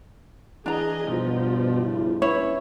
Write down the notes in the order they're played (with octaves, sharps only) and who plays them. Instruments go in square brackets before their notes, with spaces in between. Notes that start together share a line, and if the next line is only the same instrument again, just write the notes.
[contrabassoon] E3 [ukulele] D4 A#5 [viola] G#4 D#5
[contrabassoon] G2 [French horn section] B2 [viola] F3
[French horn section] C#3 E4
[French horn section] C#4 B4 [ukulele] E4 C#5